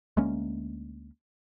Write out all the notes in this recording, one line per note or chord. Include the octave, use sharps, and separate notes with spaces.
D2 G#3 A#3 C#4